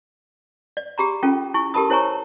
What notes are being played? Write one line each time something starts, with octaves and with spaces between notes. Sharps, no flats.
D5
G4 G#4 A#5 B5
C#4 F4 A4 G5
E4 G#5 C#6
G4 A4 A#4 A5 B5 D#6
E4 C5 C#5 G#5 A#5 C#6